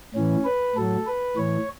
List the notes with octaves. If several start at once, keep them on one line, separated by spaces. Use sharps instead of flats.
A2 E3 C#4
B4
A2 F#3 A4
B4
A2 E3 C#5